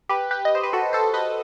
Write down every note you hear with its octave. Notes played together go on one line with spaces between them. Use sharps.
G4 B4
G4 B4
D#5
C5
B4
F#4 A4
A4 C5
B4 D#5